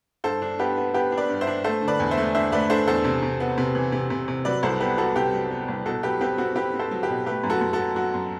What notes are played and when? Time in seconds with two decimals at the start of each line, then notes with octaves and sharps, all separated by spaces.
0.24 G2 A4 C5
0.42 D4
0.59 B3 G4 B4
0.77 B3
0.94 B3 G4 B4
1.12 D4
1.17 B4 D5
1.29 G2
1.41 C5 E5
1.47 D4
1.64 A3 A4 C5
1.82 D3
1.88 B4 D5
2.00 E2
2.11 C5 E5
2.17 A3
2.35 D4 C5 E5
2.52 A3 B4 D5
2.70 D4 A4 C5
2.87 E2 A4 C5
3.05 C3
3.22 C3
3.40 B3
3.58 C3
3.75 E3
3.92 C3
4.10 C3
4.28 C3
4.45 F#3 B4 D5
4.63 C2 A4 C5
4.80 B3 G4 B4
4.98 B3 F#4 A4
5.16 C3 G4
5.33 F#3
5.51 B3
5.68 C2
5.86 B2 F#4 A4
6.03 F#3 G4 B4
6.21 C4 G4 B4
6.38 C4 F#4 A4
6.55 C4 G4 B4
6.74 C4
6.79 A4 C5
6.91 F#3
7.03 G4 B4
7.08 B2
7.26 A3 G4 B4
7.44 F#2
7.50 F#4 A4
7.61 F#2
7.73 F#4 A4
7.79 F#3
7.96 F#3 F#4
8.14 F#2